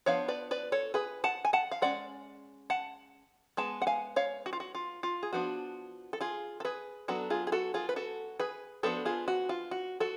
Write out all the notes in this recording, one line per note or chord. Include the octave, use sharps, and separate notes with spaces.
F3 B3 D4 C#5 F5
B4 D5
B4 D5
A4 C#5
G#4 B4
F#5 A5
G#5
F#5 A5
F5
G#3 C#4 D5 F#5
F#5 A5
G#3 B3 A5
F#5
F5 G#5
C#5 F5
F#4
F4
F#4
F4
F4
G#4
F3 B3 D4 F#4
A4
F4 G#4
A4
G#4 B4
F#3 B3 D4 F#4 A4
F4 G#4
G#4
F#4 A4
F4 G#4
B4
F#4 A4
G#4 B4
F3 B3 D4 F#4 A4
F4 G#4
F#4
F4
F#4
F#4 A4